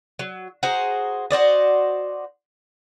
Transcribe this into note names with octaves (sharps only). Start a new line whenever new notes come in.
F#3
F#4 G#4 C5 A#5
F#4 C5 D5 D#5